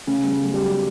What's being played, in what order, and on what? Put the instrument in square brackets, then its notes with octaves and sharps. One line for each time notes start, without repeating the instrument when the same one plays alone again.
[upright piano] C#3 [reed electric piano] A3 C#4
[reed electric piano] G3 B3
[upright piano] C#3
[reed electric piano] F#3 A3
[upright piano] G3
[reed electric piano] F#3